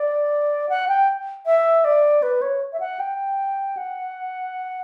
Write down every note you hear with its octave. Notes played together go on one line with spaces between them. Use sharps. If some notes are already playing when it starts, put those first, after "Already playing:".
Already playing: D5
F#5
G5
E5
D5
B4
C#5
E5
F#5
G5
F#5